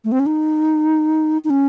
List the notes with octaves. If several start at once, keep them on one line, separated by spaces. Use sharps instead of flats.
A3
C4
C#4
D#4
D#4
C#4